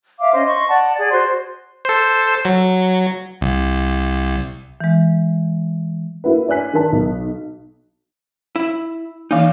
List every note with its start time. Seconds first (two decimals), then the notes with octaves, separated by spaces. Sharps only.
0.20 E5 F5 D6
0.33 C#4 C5 D#5
0.46 D#5 C6 C#6
0.68 D5 F#5 A5
0.98 G#4 D5
1.12 F#4 C5 C6
1.85 A4 C5
2.45 F#3
3.41 C2
4.81 E3 G#3
6.24 A#3 E4 F#4 B4
6.48 D5 G#5 F#6 B6
6.73 D#3 A#4 A5
6.92 B1
8.56 E4
9.31 E3 A#3 D#4 F5